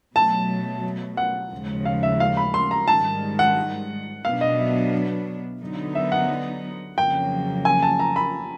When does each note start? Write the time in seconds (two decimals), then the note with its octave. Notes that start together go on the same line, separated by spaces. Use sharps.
0.15 B2 F#3 A3 A5
1.17 F#5
1.52 D#2 C#3 F3 G#3
1.85 F5
2.03 E5
2.20 F5
2.37 B5
2.54 C6
2.71 A#5
2.88 G#2 D#3 G3 A5
3.39 F#5
4.25 B2 F#3 B3 D4 F5
4.41 D#5
4.59 E5
5.61 D3 F#3 B3 D#4
5.95 E5
6.12 F#5
6.97 F2 C#3 F#3 A#3 G5
7.65 G#5
7.82 A5
7.99 A#5
8.16 B5